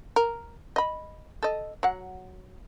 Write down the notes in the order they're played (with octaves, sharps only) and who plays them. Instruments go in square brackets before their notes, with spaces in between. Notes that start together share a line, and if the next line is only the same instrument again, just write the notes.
[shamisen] A#4
D#5 B5
A4 D#5
F#3 F#5